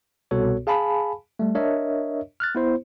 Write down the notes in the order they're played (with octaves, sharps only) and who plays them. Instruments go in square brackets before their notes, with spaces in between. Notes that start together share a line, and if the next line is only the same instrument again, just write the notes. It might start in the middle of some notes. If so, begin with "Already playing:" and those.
[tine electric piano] C2 B2 B3 F#4 A4 C#5
G#4 F5 G#5 A5 B5
G3 A3
D4 A#4 C#5 D#5 E5
F6 F#6 A6
B3 E4 C5